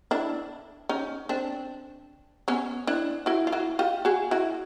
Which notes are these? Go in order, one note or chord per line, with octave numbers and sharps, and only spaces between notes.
D4 E4
C#4 D#4
C4 D4
B3 C#4
D4 E4
E4 F#4
F4
E4 F#4
F4 G4
F#4 G#4
E4 F#4